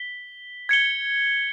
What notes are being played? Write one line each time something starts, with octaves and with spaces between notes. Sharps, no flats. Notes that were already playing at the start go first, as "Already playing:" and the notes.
Already playing: B6 G7
G#6 C#7 G7